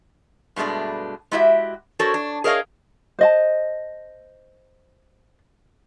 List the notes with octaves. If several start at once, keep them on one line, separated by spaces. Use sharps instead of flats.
G2 B2 G#3 A3 D4
G#3 E4 F#4 G4 E5
D4 F#4 A4 A#4 C5 C#5
D4
G#4 A#4 C#5 D#5 F5
C5 D#5 A5